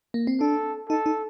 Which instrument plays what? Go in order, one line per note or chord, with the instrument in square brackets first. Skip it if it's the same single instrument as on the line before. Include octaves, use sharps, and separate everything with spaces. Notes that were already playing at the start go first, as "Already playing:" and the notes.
[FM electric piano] A#3
C4
[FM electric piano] D4 [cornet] A4
[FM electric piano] D#4 [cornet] A4
[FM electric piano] D#4